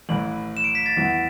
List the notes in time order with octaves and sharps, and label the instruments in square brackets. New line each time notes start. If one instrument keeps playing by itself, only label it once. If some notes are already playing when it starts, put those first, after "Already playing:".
[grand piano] A1 A2 E3 [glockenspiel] F#7
[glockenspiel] E7
D7
B6
A6
[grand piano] E2 E3 B3 E4